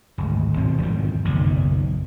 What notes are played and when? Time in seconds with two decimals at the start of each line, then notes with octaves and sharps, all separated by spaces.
0.18 D1 G#1 G#3
0.57 G#1 B2 C4
0.82 E2 G#2 D3 D#3
1.24 F#1 B1 A#2 D#3